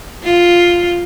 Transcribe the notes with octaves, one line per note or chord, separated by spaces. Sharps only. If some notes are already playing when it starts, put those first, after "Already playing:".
F4